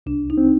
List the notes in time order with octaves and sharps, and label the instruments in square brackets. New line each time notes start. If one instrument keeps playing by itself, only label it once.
[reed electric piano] C2 [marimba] D4
[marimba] D#4
[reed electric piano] C4